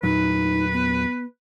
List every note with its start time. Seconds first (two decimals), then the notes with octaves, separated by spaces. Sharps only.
0.03 E2 A#2 F#3 D#4 B4
0.73 B3